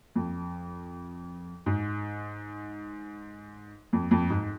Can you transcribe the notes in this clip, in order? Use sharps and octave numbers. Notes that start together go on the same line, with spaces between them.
F2
G#2
F2
F2
G#2